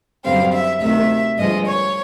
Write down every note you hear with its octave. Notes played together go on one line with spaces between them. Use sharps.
F#2 D3 G3 C4 F5
E5
D2 C3 D#3 E5
G2 D3 F3 G#3 D#5
C#5